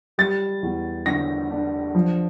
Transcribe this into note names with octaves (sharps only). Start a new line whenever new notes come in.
G3 A6
E2
D3 A#6
D4
F3